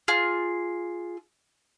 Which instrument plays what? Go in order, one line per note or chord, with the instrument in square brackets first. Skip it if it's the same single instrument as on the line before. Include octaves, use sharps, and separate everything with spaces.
[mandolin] F4 G#4